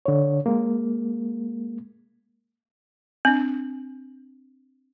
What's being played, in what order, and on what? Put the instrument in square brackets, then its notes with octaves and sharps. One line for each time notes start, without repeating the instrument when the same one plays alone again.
[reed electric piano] D3 C#5
G#3 A#3
[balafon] C4 D4